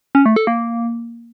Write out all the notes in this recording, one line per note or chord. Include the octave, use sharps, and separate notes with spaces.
C#4
A3
A4
A#3